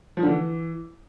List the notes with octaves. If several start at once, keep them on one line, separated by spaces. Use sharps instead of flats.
F3
D3
E3